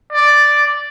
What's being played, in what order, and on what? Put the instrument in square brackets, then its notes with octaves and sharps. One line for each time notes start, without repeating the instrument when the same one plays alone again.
[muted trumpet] D5